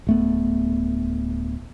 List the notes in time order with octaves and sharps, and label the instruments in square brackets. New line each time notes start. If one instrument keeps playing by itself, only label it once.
[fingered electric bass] D1 A3 B3